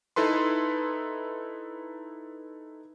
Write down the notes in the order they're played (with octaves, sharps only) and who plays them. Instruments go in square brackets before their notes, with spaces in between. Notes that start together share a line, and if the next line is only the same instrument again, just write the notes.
[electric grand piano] D#4 E4 A4 B4 C6